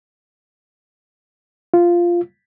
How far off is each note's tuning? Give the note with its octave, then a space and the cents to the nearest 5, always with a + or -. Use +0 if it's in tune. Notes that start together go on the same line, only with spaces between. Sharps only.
F4 -5